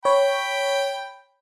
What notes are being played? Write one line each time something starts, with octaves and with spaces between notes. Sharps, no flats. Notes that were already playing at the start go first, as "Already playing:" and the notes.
C#5 G5 B5